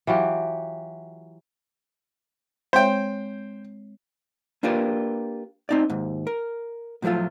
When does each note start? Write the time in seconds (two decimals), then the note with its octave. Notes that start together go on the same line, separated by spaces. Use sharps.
0.07 E3 F#3 F4 G4
2.73 G#3 C4 C5 C#5 G5
4.63 A#3 D4 F4 G4 A#4 B4
5.69 C4 D#4 D5
5.90 D#2 G#2
6.27 A#4
7.02 A2 F3 F#3 A3 F4